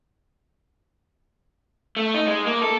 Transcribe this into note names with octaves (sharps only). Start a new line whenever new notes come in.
A3
D#4
G#3
A#3
A4